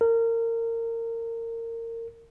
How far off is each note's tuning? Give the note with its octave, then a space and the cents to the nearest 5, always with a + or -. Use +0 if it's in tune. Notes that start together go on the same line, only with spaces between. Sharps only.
A#4 -25